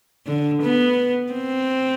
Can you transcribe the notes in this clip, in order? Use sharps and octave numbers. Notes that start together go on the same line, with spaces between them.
D3
B3
C4